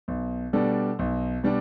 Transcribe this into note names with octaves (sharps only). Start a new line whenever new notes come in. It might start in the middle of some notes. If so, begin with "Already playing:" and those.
B1
B2 G3 D4 A4
B1
B2 G3 D4